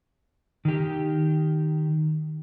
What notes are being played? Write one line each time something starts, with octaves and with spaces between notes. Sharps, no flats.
D#3 G4